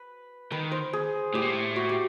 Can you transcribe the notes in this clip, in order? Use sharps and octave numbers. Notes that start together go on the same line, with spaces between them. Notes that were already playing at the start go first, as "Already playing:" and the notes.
Already playing: B4
D#3 B4
C5
G#4
A2 G4
A#2
A2
F#4
G4